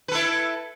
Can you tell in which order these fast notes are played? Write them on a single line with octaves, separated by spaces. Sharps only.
B4 A4 E4